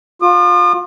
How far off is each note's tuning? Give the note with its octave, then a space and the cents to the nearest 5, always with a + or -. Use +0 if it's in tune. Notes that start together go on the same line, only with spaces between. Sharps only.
F4 +25 D#6 -45